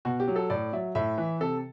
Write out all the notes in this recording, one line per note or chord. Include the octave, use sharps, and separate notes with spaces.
B2 F#4
G4
F#3
A4
A2 D5
F#3 E5
A2 E5
E3
C3 A4